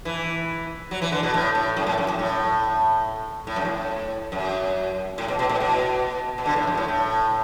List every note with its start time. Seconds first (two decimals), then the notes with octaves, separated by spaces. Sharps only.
0.05 E3
0.91 F#3
1.02 E3
1.12 D3
1.23 B2
1.34 A2
1.55 A2
1.76 F#2
1.87 A2
1.98 F#2
2.08 F#2
2.19 A2
3.47 A2
3.56 F#2
3.65 A2
4.32 F#2
5.18 A2
5.28 B2
5.39 B2
5.49 A2
5.60 B2
6.38 B2
6.46 D3
6.56 A2
6.67 F#2
6.77 A2
6.88 A2